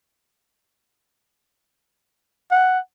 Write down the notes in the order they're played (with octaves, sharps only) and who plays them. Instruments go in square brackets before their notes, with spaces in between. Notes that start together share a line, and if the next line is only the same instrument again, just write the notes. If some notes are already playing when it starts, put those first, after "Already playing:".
[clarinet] F#5